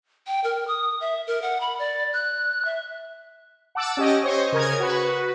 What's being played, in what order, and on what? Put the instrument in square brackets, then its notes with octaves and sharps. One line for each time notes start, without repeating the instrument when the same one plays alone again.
[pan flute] G5
A#4
D#6
E5
A#4
F#5
B5
D5
F#6
E5
[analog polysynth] F#5 A5 D6 E6
C#4 G4 D#5
C5 C#5 D#5
C#3 A#4 D#6 G#6
F#4 B4